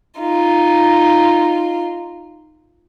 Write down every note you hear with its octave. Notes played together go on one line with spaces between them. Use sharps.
D#4 F4